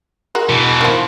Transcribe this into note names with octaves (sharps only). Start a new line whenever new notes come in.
G#3 F#4 A#4
B2 E3
D#3 F3